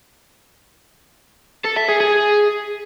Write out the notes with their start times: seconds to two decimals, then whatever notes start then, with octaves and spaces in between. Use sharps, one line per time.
1.65 A4
1.77 E5
1.89 G#4
2.00 G#4